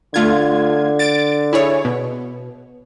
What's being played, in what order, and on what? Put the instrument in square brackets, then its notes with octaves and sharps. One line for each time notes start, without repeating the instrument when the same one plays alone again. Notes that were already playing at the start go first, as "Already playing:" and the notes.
[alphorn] D3 [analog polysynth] A3 F4 G#6
[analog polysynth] A6 D7
E4 G#4 C#5
B2